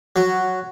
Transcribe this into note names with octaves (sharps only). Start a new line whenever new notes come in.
F#3